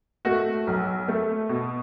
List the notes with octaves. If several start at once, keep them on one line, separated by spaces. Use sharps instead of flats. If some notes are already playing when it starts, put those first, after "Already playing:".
A3 F#4
B1
A3
B2